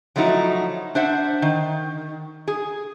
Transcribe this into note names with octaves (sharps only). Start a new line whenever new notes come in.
F3 F#3 A3 D#4 E4 F#4
D4 C5 E5 F#5
D#3
G#4